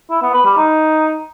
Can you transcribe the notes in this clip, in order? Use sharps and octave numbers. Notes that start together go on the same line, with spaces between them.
E4
B3
B4
G3
D#4